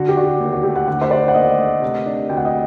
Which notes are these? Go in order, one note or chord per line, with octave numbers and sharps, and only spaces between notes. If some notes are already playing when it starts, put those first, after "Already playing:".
Already playing: D3 F#4
G4
D4 F#4
G4
D#2
F#4
A3 G4
F#5
D3 F#5
C5
D4 D5
F#5
D#2 D#5
A3
C3
D4
D2 G5
F#5
D#5